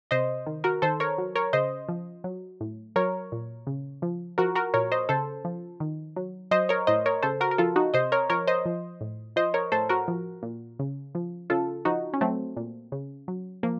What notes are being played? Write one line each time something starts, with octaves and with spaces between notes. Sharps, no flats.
C3 C5 D#5
D#3
F#4 A#4
D#3 A4 C5
A#4 C#5
F#3
A#4 C#5
C#3 C5 D#5
F3
F#3
A2
F#3 A#4 C#5
A#2
C#3
F3
F3 F#4 A#4
F#4 A#4
A#2 A#4 C#5
C5 D#5
C#3 A4 C5
F3
D#3
F#3
F#3 C5 D#5
A#4 C#5
A2 C5 D#5
A#4 C#5
C#3 A4 C5
F#4 A#4
A#4
F3 F4 A4
D#4 F#4
C3 C5 D#5
A#4 C#5
F3 A#4 C#5
C5 D#5
F3
A2
F3 C5 D#5
A#4 C#5
A2 A4 C5
F#4 A#4
F3
A#2
C#3
F3
C#3 F4 A4
F3 D#4 F#4
C#4
F#3 A3 C4
A#2
C#3
F#3
F3 A#3